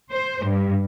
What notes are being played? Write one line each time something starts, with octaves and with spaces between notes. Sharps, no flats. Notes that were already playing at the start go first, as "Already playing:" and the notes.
C5
G2